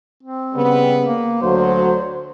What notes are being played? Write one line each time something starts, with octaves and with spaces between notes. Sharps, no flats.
C4
C#3 G3 B3
A#3
D2 F#3 C5